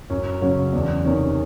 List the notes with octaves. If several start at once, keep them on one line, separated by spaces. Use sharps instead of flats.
F#2 C#4
C#3 F#3 C#4
E2 D4
C3 D#3 C#4